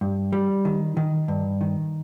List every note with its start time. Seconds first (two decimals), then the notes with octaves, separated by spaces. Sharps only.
0.01 G2
0.33 G3
0.65 D#3
0.97 D#3
1.28 G2
1.61 D#3